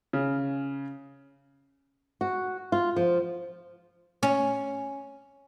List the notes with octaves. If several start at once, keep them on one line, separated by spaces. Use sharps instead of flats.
C#3
F#4
F4
F3
C#4